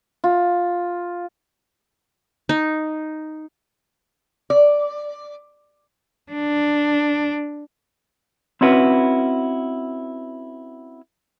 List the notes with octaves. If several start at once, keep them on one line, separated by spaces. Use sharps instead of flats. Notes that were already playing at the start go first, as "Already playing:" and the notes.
F4
D#4
D5
D4
C4 C#4 E4 F#4 B4